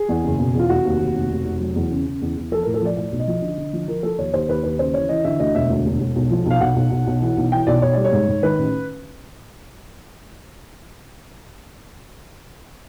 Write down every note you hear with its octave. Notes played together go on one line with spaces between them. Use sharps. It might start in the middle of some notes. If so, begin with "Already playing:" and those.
Already playing: G#4
E2
F#1
B2
E2 F4
F1 F#4
D#2
D#2
F1
F1
F1
F#3
E2
C#3
C#3
E2
E2
F3 A4
A2 A#4
A4
F3 D5
A2 D5
B1
D#5
F3
D3
D3
F3
F3 A#4
F3 A4
D#2 C#5
D#2 C5
D#2 B4
D#2 B4
C#3 C5
E3 C#5
E3 D#5
D3 E5
D2 D#5
E1 E5
D2
E1
E1
B1
F3
B1 F5
B1 F#5
B1
B1
B1
E3
B1
E3 G5
B1 D5
B1 C#5
G3 D5
C#5
G#2
G#2
D#3 B4
A1